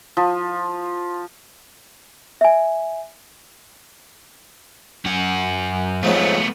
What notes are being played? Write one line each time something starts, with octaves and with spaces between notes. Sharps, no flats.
F3
E5 G#5
F#2 F#5
F2 G#2 F#3 A3 B3
A3 B3